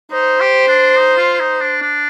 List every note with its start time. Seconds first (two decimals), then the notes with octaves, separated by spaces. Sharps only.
0.12 D#4 C5
0.41 G4
0.68 D4
0.97 D#4
1.17 F4
1.40 D#4
1.61 D4
1.82 D4